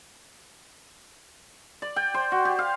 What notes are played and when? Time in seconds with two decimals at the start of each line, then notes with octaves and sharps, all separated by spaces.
1.82 D5
1.96 G5
2.14 C5
2.32 F#4
2.45 G4
2.59 F5